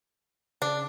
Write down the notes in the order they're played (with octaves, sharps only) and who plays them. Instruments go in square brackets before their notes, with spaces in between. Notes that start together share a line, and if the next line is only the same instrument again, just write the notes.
[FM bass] C#3 [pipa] D4